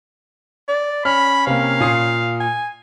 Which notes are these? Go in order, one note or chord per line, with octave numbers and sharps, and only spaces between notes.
D5
C#4 B5 F6
C3 A#3 F5
A#2 D#6 C7
G#5